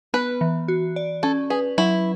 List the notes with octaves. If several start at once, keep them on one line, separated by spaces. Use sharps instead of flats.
B3 B4
E3
F#4
D5
C#4 A4
G#4 B4
F#3 E4